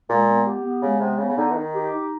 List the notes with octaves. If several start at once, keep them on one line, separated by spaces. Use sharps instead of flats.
A#2 G#3
B3
G4
B3
C#3 G#3
C3 B3
C#3 B3
C#3
D3 D#4
E3
D#3 D#4
G4
D#4